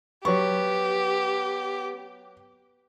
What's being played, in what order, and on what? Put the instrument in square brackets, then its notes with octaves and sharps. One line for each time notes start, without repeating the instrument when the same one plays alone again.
[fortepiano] F#3 C#6 [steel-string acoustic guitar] B3 [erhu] G4